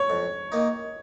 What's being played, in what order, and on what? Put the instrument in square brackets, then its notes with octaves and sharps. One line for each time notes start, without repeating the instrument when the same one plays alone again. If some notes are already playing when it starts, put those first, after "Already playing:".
Already playing: [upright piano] C#5
[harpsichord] F2
D#3 A#3 D#4